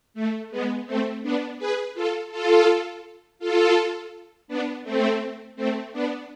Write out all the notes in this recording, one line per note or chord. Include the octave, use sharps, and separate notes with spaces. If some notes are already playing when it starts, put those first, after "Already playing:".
A3
G#3 B3
A3 C4
B3 D4
G#4 B4
F4 A4
F4 A4
F4 A4
B3 D4
A3 C4
A3 C4
B3 D4